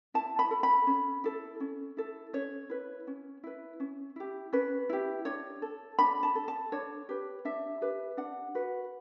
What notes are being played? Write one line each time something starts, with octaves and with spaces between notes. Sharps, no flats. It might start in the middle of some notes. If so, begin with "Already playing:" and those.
E4 A5
B5
A4
B5
C#4
E4 A4
C#4
E4 A4
C#4 C#5
E4 B4
C#4
E4 B4
C#4
E4 G4
C#4 B4
E4 G4
D4 C#5
A4
D4 B5
A5
A4
A5
D4 C#5
G4 B4
D4 E5
G4 B4
D4 F#5
F#4 B4